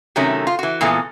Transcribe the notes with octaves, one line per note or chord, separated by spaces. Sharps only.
C3 D#3 F#3 A3 C#4
F4
E3 F#4
A#2 E3 G#3 B3 A4